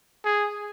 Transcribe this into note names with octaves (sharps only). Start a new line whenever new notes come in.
G#4